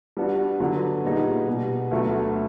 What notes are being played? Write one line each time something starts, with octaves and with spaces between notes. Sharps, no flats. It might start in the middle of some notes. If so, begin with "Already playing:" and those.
G3 B3 D4 F#4
D3 F#3 B3
A#2 G3 B3 D#4 G#4
B2 G3 B3
D2 D3 F#3 A3